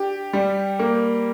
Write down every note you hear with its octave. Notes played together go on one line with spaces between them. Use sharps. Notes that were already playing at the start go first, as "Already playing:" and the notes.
Already playing: D4 G4
G3
A#3